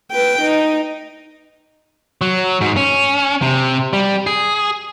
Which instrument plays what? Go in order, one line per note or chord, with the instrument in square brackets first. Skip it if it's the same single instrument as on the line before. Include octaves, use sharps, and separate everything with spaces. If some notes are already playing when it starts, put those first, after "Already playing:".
[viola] B4 G5
D#4
[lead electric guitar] F#3
G#2
C#4
C3
G3
G#4